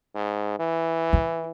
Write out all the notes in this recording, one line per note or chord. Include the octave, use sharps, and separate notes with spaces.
G#2
E3
E4